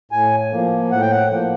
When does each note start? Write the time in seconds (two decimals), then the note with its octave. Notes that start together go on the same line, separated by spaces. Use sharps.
0.12 A2 G#5
0.52 F3 A#3
0.91 A2 F#5
1.01 G5
1.11 F#5
1.31 F3 A#3